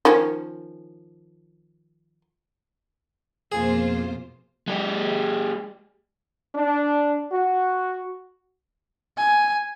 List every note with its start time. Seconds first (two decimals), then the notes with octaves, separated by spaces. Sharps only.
0.05 D#3 F3 C#4
3.52 F2 B2 A#3 F4 G#4 C5
4.68 G#3 G4
6.55 D4
7.32 F#4
9.18 G#5